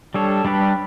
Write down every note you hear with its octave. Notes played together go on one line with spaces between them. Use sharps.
G3 D4 A4 C#5
G3 D4 G4 B4